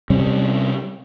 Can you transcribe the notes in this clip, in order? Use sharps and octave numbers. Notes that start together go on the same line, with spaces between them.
C3 G3 C#4